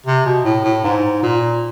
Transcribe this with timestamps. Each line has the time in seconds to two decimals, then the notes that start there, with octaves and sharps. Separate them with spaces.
0.06 C3
0.26 B2
0.44 A2
0.64 A2
0.84 G#2
1.23 A#2